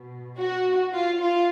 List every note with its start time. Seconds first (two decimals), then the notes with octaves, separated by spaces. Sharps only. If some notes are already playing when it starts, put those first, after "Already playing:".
Already playing: B2
0.37 F#4
0.93 F4
1.21 F4